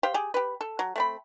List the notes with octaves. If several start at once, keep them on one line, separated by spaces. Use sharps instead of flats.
G4 C5 F5 G5
G4 G#4
G4 B4
A4
F#3
A3 C4 B5